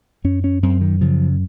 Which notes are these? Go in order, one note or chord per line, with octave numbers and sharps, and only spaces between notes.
F#2 C#4
C#4
F#2 C4
D#3
C#3 F3